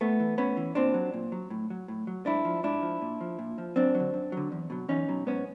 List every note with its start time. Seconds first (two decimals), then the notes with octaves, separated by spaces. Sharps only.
0.01 A2 A3 B3
0.20 E3
0.38 A2 B3 C#4
0.57 E3
0.75 A#2 C4 D4
0.94 F#3
1.14 A#2
1.32 F#3
1.50 A2
1.70 F#3
1.88 A2
2.07 F#3
2.26 G#2 D4 E4
2.45 F3
2.63 G#2 D4 E4
2.82 F3
3.02 A#2
3.21 F3
3.39 A#2
3.58 F3
3.76 F#2 C4 D4
3.95 F#3
4.00 D3
4.14 F#2
4.32 D3 F#3
4.52 E2
4.70 B2 F#3
4.89 E2 C#4 D#4
5.08 B2 F#3
5.26 G#2 B3 C#4